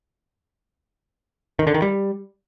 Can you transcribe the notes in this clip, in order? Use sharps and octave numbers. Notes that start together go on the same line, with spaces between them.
D#3
D3
D#3
G3